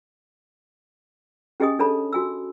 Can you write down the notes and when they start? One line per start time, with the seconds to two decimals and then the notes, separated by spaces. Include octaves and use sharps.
1.60 C#4 G4 G#4 D#5 G#5 D#6
1.79 D4 A4 C#5 A5 B5
2.13 F#4 G#5 E6